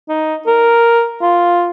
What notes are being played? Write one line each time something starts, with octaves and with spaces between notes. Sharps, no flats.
D#4
A#4
F4